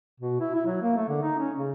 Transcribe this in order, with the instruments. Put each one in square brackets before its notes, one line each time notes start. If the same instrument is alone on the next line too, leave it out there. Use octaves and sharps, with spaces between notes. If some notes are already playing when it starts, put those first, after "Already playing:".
[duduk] B2
E4
E4
F#3
A#3
A3
D3
D#4
C#4
C#3